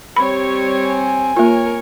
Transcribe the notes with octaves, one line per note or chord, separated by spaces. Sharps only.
G3 C4 C#5 B5
G#5
A#3 F4 A#4 C#5